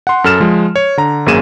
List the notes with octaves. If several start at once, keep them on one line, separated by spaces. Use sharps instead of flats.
F#5 C6
F#2 A4 F6 E7
F3 G#3
C#5
D3 A#5
G#1 F#2 A#3 G#4 D#7 E7